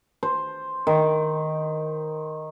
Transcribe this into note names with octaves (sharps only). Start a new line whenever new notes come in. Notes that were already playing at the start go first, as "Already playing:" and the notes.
C5
D#3